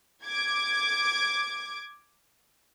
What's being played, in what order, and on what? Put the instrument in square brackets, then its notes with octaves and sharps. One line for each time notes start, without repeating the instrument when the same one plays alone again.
[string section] D6 G#6